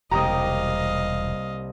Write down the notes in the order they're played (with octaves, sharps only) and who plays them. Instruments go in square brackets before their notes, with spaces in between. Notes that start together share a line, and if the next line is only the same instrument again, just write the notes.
[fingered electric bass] E1 [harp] C2 A#3 G4 [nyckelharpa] D#5 F5 [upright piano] A#5 D#6